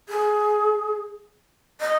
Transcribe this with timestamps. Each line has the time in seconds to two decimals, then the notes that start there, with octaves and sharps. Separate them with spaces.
0.09 G#4
1.80 D#5